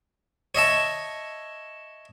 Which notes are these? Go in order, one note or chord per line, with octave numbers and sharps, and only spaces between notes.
C#5 D#5 E5 A5